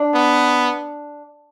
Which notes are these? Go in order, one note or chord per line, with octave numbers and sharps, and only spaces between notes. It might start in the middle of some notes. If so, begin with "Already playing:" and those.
Already playing: D4
B3